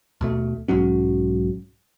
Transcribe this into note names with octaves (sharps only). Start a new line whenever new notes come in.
D#2 B2 A3
B1 G#2 F#3 C#4